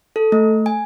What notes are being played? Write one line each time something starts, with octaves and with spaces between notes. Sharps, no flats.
A4
A3
G#5